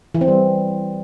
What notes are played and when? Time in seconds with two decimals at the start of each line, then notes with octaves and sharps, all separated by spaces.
0.14 E3
0.21 C4
0.28 G3